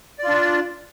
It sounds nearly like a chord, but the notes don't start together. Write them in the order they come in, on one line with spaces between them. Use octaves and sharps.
D5 F4 D4